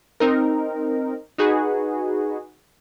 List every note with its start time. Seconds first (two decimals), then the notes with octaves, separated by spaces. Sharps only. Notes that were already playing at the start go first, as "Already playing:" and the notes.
0.20 C4 D#4 A#4
1.38 D#4 F#4 G#4 B4